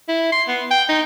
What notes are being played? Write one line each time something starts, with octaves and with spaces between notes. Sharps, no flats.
E4
C6
B3
G5
D#4